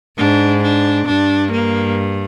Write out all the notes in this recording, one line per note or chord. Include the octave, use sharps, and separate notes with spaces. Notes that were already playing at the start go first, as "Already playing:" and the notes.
G#2 D4
D4
G2 D4
A#3